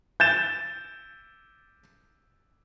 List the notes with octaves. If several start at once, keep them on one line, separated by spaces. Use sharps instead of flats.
G6 A6 E7